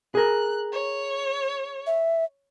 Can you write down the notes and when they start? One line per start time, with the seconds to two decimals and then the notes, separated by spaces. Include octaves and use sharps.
0.15 G#4 A#4 F#6
0.72 C#5
1.87 E5